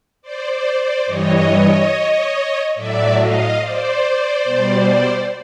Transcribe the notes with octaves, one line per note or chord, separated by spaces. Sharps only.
C5 D5
C5 D5
C5 D5
G2 E3 G3 C#5 D#5
A2 F#3 D5 E5
D#5 F5
C5 D5
B2 G3